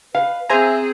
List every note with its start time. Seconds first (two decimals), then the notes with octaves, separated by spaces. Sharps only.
0.15 B4 F5
0.50 C4 G#4 C5 E5 G#5 A#5